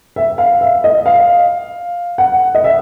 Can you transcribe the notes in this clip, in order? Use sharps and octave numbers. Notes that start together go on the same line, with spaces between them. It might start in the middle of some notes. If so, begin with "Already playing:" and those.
E5
F5
E5
D#5
F5
F#5
D#5
E5